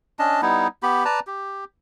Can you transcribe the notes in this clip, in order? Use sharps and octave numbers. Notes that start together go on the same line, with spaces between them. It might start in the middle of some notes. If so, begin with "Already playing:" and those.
C#4 D4 D#5 A5
G3 B3 D#4 E4
B3 G4 B5
B4 D5 A5 A#5
G4